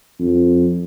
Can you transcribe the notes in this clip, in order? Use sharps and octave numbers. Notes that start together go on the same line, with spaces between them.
F2